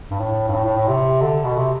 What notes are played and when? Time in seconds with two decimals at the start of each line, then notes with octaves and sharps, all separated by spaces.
0.11 G2
0.20 A2
0.48 G2
0.54 A2
0.65 A2
0.76 A2
0.88 C3
1.22 D3
1.44 B2
1.56 C3